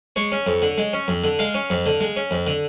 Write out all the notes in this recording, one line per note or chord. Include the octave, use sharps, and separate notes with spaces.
G#3 C#5
C#4
F2
D3
G#3
C#4
F2
D3
G#3 F5
C#4
F2
D3
G#3
C#4
F2
D3